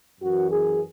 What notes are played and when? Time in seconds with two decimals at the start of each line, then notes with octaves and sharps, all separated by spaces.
0.21 F#2 E3 F#4
0.51 G#4